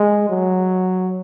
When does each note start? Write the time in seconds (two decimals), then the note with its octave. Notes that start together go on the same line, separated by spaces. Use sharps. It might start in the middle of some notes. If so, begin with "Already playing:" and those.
Already playing: G#3
0.29 F#3